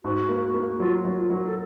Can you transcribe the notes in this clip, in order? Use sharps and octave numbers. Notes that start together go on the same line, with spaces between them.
G#2 F#4
A#3
F#4
A#3
F#3 F4
F#3
F4
F#3
A4